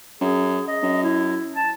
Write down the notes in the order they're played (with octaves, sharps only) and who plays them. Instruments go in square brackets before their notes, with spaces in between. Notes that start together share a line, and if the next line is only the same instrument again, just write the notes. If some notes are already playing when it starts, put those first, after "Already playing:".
[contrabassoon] F#2 [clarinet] G#4
[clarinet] D#5
[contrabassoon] F#2
[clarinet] E4
A5